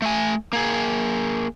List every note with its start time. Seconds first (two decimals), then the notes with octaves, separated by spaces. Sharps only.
0.02 A3 G#5
0.53 A#3 G#4